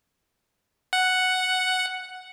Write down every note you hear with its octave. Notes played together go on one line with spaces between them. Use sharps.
F#5